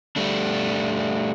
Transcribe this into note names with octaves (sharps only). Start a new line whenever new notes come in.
G3 A3 D4